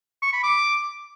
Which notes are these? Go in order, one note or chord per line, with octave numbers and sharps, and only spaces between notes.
C#6
B5
D6